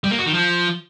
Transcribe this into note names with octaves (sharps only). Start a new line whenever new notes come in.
G3
A#3
F#4
D#3
F3